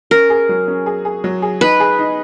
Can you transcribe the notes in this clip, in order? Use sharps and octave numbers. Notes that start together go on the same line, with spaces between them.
C#4 A#4
G#4
F#3
C#4
G#4
G#4
F#3
G#4
D#4 B4
G#4
D#4